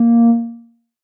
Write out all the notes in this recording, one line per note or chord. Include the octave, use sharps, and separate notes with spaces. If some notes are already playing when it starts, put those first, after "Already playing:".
Already playing: A#3